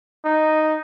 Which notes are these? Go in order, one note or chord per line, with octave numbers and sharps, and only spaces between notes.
D#4